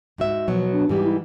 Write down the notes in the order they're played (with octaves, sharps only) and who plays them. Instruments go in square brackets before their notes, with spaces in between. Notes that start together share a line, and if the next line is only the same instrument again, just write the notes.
[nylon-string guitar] G#2 F#4 E5
[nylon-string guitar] B2 F#3 [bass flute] F3
[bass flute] D4
[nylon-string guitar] G#2 E3 G3 [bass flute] G4
[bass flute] E4